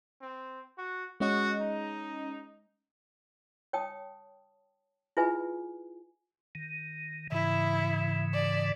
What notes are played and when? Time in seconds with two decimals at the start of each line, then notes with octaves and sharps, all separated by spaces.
0.22 C4
0.78 F#4
1.20 G#3 C#4 F#4 D#5
1.61 D#4
3.73 C#5 G5 A5 D#6
5.17 E4 F4 G#4 B4 E5 G#5
6.55 D#3
7.32 G#2 C#3 E3 E4
8.33 D5